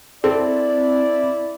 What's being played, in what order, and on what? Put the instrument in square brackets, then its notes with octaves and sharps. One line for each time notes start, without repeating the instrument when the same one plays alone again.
[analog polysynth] C4 [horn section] E4 D5 [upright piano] A4